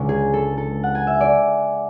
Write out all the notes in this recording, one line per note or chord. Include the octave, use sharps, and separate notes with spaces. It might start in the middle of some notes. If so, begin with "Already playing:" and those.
Already playing: C#2 C#3 G#3 D4
G#4
A4
A4
F#5
G#5
E5
D5